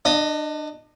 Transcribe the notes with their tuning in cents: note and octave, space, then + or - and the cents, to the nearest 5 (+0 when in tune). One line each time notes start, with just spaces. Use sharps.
D4 +30 D#5 +0